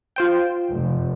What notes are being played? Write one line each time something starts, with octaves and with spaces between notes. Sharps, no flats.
F4 C5 G5
F1